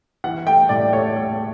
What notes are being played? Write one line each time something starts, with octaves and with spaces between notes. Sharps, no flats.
E3 F#5
A3 G5
A2 D5
A3 C#5
A3